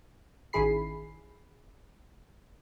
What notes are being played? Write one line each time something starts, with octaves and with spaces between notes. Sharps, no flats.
A1 D#3 E4 G#4 B5 C7